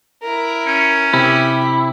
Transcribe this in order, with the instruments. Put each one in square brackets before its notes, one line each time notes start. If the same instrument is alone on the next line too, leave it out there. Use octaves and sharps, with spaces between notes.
[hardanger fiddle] E4 A#4
[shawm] C#4
[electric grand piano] C3 [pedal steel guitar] E4 [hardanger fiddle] G4 B5